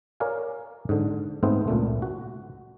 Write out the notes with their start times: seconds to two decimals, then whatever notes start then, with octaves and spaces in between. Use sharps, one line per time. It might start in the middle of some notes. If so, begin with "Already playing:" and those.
0.20 A#4 C#5 D5 F5 G#5
0.89 G#2 D3
1.43 G#2 A3 B3 C4 C5
1.68 C#2 A#2 A3
2.02 F#4